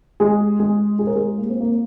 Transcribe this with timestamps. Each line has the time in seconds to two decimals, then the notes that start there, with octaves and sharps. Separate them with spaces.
0.20 G#3 G#4
0.60 G#3 G#4
0.99 G#4
1.07 A#4
1.15 G#3 G#4
1.38 A#3
1.49 C4
1.61 A#3